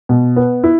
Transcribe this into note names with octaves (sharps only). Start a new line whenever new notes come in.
B2
B3
E4